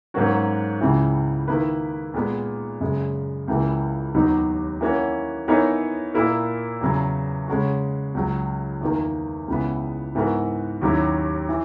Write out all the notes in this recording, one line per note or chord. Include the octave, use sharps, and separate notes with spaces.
G#2 F#3 A#3 C#4 F#4
C#2 C#3 E3
D#3 A#3 E4 B4
A#2 G#3 B3
F#2 C#3 G#3
C#2 C#3 E3 A#3
D#2 D#3 F#3 B3 D#4
E3 A#3 C#4 F#4
E3 B3 D#4 A#4 C#5
A#2 A#3 E4 A#4
E2 C#3 F#3
C#3 G#3 C#4 F#4
C#2 C#3 F#3
E2 D#3 A#3
C#2 C#3 E3 B3
G#2 E3 B3 F#4 A#4
D#2 D#3 F#3 C#4 E4
E3